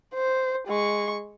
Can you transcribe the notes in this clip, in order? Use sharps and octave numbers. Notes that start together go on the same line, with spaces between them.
C5
G#3 C#6